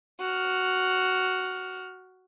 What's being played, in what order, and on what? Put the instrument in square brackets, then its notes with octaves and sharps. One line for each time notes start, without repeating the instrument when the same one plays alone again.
[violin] F#4 F6